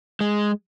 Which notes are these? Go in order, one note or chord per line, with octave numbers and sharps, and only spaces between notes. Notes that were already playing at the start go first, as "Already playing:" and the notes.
G#3